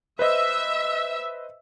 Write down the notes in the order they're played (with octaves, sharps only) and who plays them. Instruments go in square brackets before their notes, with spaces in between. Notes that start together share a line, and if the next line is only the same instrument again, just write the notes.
[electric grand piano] B4 C5 D#5 [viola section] E5